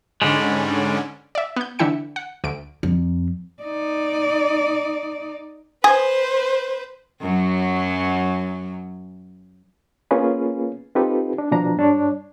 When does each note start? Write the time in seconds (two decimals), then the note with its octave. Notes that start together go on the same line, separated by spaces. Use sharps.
0.22 G#2 D3 G3 G#3 C#4
1.35 D5 E5
1.56 B3 G6
1.79 D3 E3 E4 G5 C#7
2.16 F#5
2.44 D2 D7
2.83 F2
3.62 D#4 D5
5.84 G#4 B4 C5
7.21 F#2 F#3
10.11 A#3 B3 C#4 F4 G#4 B4
10.95 C4 D#4 F4 G4 A4 B4
11.38 D4
11.51 B2 E3 F3 D4 A#5
11.77 G2 D4 C#5